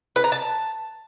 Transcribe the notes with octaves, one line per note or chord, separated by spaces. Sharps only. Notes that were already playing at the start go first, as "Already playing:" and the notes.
B4
A#5
A5